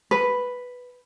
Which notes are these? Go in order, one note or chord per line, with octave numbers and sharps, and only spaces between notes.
B4